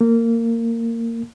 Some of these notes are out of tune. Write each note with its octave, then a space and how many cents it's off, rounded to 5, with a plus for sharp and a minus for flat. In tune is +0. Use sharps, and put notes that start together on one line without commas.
A#3 -20